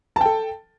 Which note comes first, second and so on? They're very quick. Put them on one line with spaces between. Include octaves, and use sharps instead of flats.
A5 G5 A4